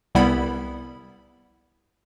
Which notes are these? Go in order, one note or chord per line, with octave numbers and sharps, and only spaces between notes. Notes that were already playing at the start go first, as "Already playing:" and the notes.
C2 G3 B3 E4 B5